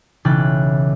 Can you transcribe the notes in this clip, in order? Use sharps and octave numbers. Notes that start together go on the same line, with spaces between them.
B1 C#3 E3 G5 F#6 A6